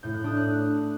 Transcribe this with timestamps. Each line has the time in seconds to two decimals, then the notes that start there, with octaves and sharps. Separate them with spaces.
0.03 A2 G6
0.14 F#6
0.24 D4 D#6
0.37 F#6